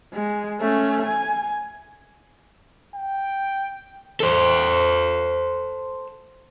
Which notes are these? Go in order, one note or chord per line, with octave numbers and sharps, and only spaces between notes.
G#3
A3 C#4
G#5
G5
A4 C5